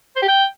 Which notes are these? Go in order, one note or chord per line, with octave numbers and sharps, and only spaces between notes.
C5
G4
G5